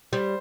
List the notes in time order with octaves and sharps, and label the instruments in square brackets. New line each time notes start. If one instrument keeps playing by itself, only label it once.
[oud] G3 [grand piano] C5